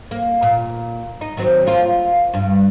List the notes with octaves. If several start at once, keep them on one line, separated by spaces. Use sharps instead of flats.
A#3
A#2
D#4
D#3 F#3 C4
A#3 F4
G2